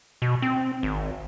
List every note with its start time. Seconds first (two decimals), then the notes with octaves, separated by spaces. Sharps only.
0.22 B2
0.42 C4
0.83 G#1